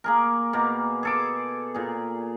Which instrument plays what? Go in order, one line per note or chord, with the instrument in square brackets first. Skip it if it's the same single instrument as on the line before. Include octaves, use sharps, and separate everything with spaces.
[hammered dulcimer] A#3 G#4 A#4
B2 A#3
G#4 A4 D6
A#2 G#4